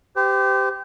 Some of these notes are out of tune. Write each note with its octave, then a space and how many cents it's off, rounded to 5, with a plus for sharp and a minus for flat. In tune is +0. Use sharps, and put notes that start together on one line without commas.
G4 +0 C5 -35